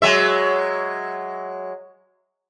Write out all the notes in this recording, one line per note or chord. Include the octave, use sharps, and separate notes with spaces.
F#3 G#3 E5